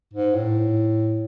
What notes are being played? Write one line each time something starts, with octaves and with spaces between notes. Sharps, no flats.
G#2
A2